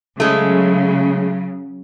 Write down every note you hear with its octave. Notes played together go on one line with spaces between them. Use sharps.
C#3 F#3 G#3 A3